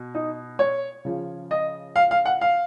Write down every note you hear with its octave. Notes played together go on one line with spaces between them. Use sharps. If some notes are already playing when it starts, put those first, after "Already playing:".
Already playing: B2
D#4
C#5
C#3 F3
D#5
F5
F5
F#5
F5